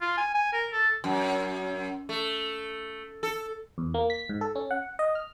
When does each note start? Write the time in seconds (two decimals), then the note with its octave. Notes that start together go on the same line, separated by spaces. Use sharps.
0.01 F4
0.18 G#5
0.35 G#5
0.53 A#4
0.73 A4
1.04 F#2
2.09 A3
3.23 A4
3.78 E2
3.94 A#3
4.10 B6
4.29 G#2
4.41 A4
4.55 C#4
4.71 F#5
4.99 D#5
5.15 F6